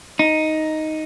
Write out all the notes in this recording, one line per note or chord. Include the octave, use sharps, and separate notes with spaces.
D#4